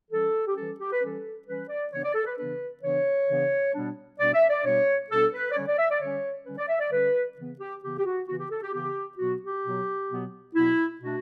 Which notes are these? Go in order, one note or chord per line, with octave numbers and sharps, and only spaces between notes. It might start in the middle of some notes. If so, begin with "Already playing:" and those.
E3 G3 C#4 A4
G4
E3 G3 C#4 A4
G4
B4
E3 G3 C#4 A4
E3 G3 C#4 B4
D5
C#3 E3 B3 D4 C#5
D5
A4
B4
C#3 E3 B3 D4 B4
C#3 E3 B3 D4 C#5
C#3 E3 B3 D4
B2 G3 B3 D4
B2 G3 B3 D4 D5
E5
D5
B2 G3 B3 D4 C#5
B2 G3 B3 D4 A4
B4
D5
D3 G3 C#4 C#5
D5
E5
D5
D3 G3 C#4 C#5
D3 G3 C#4 B4
D5
E5
D5
D3 G3 C#4 B4
C#3 E3 B3
G4
C#3 E3 B3 G4
G4
F#4
C#3 E3 B3 F#4
G4
A4
G4
C#3 E3 B3 G4
B2 F#3 B3 F#4
G4
B2 F#3 B3
B2 F#3 B3
B2 F#3 B3 E4
B2 A3 D4 F#4